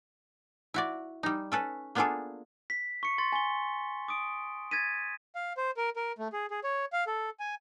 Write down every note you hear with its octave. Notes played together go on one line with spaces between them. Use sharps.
E4 F#4 D5
G3 D#4
C#4 A4 B4
A#3 B3 D4 F4 G#4 A4
B6
C#6 C#7
C6 A6
G#5 G7
D6 D#6 D7
G#6 A6 B6 D#7
F5
C5
A#4
A#4
A3
G#4
G#4
C#5
F5
A4
G#5